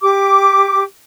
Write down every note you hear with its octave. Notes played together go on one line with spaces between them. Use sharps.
G4 D6